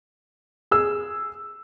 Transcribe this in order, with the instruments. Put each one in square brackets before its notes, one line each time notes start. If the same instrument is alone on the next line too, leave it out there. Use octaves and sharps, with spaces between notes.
[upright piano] G#4 E6